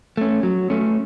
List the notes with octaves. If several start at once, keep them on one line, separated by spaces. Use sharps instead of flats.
A3 C#4
F#3
A3 C#4